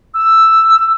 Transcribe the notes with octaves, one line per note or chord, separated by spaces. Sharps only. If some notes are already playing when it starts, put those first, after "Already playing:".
E6